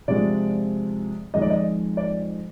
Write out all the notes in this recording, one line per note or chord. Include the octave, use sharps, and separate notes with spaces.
C3 F3 G#3 D4 F4 D5
F2 D#3 G#3 D#5
D5
D#5
D5